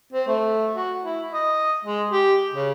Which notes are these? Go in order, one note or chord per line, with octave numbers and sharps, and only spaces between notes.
C4
A3
F#4
E4
D#5
G#3
G4
C#3